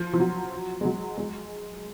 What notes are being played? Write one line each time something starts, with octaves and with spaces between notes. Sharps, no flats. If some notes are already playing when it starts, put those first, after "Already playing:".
Already playing: F3
F3
F#3
G#3
F#3
G#3